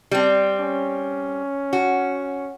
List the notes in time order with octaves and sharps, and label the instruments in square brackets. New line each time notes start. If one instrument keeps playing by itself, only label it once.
[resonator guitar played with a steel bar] G3 C4
[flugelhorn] C#4
[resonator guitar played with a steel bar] F#4